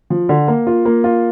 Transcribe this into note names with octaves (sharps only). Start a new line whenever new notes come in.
F3
D3
A#3
F4
A#3
F4